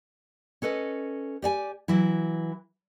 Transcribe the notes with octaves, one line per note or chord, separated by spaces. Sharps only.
C#4 A4 B4 D#5
G4 D5 G#5
E3 F#3 E4